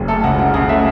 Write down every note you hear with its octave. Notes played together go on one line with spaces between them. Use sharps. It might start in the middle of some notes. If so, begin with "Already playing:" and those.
Already playing: F#1
A3 A4
C#2 F#5
C#3 F#5
C#3 F#5
A3 E5